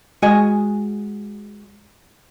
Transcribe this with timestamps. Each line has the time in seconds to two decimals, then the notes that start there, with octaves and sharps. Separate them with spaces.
0.22 G#3 F#4 D#5 G#5